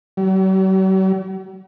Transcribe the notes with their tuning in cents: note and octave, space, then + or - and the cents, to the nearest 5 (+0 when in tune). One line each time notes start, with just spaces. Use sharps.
F#3 +45